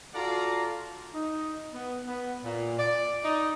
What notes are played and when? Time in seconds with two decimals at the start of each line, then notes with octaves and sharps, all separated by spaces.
0.15 F4 F#4 A4 D5 F5 A#5
1.14 D#4
1.73 B3
2.08 B3
2.44 A#2
2.78 D5
3.24 D#4